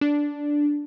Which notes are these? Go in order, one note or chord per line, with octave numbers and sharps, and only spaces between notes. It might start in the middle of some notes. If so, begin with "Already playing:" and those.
D4